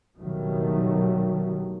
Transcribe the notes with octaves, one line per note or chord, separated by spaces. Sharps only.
F#1 B2 D#3 F#3 G3 A3